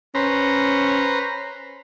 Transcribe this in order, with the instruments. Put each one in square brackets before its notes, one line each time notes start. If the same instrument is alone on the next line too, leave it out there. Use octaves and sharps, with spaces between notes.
[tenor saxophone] C#4 [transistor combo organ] B4 C5 A#5